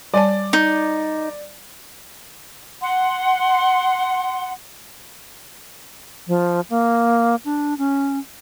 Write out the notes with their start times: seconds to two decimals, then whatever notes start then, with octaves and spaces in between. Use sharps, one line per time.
0.14 G3 D5 G#5 A5
0.53 D#4
2.81 F#5 C6
6.28 F3
6.70 A#3
7.45 D4
7.78 C#4